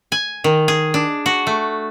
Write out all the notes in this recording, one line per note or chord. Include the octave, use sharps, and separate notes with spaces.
G#5
D#3
G#4
D4
F#4
A3